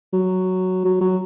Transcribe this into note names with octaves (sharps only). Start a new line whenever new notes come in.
F#3
F#3
F#3